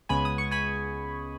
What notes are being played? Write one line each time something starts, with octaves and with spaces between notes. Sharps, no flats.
C#2 C#3 G#3 B3 G#5 B5
D#6
C#6
G#5 B5